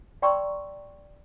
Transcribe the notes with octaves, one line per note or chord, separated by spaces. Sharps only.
D5 G5 A#5 C6 C#6 E6